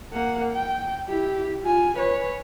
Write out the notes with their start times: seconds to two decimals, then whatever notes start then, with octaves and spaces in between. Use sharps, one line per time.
0.13 A#3 F#5
0.52 G5
1.09 E4 G4
1.64 F4 G#5
1.98 B4 C#5